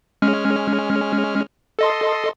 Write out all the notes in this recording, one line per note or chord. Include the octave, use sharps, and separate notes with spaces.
G#3 C#4 F6
A4 D#5 C6